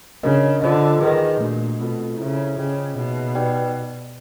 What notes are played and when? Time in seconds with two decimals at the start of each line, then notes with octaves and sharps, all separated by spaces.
0.23 C#3 D4 F#4 A#4 D#5
0.62 D3 F4 A4 C5 D#5
1.01 D#3 G#4 B4 D#5
1.40 A#2 A3 D4 F#4
1.80 B2 A3 C4 F4 A4
2.18 C#3 E4 A4 C5 E5
2.57 C#3 F4 G#4 C5 D#5 G5
2.96 B2 A#3 D#4 G#4 C#5 E5
3.35 D#4 G4 B4 D5 G5